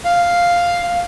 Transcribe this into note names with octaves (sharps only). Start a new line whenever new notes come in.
F5